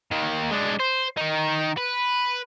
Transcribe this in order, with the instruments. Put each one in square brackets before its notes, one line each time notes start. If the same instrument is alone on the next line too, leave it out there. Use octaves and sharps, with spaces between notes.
[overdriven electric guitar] D#2 D#3
G#3 D4
C5
D#3 D#4
B4